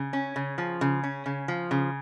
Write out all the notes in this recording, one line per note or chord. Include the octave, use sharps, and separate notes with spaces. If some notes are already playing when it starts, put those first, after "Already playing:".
Already playing: C#3
C#4
C#3
F3
C#3
C#4
C#3
F3
C#3